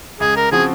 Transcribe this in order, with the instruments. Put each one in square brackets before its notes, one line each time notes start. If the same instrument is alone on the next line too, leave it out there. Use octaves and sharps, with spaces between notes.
[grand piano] C#2 [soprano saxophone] G#4
[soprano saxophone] A#4
[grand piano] C#3 F3 C4 F#4 [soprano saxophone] G#4